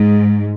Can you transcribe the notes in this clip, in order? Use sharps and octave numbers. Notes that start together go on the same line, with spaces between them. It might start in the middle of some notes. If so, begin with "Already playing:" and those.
Already playing: G#2